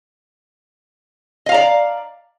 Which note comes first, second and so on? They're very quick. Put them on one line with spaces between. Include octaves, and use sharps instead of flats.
D#5 F5 A#5 D5